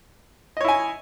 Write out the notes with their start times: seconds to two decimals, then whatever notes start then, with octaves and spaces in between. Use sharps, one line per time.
0.57 D#5
0.61 C#5
0.65 E4
0.68 G#5